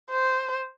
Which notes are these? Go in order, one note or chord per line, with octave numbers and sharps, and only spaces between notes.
C5